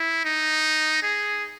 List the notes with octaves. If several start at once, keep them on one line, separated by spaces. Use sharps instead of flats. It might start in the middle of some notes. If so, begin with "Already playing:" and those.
Already playing: E4
D#4
G#4